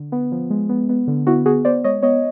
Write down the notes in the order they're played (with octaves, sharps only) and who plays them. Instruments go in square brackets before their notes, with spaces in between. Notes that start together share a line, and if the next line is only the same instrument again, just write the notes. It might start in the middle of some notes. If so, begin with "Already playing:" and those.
Already playing: [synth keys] D3
B3
F3
G#3
B3
B3
D3
B3 E4 F#4
B3 F#4 G#4
B3 C5 D5
G#3 C#5 D#5
B3 C#5 D#5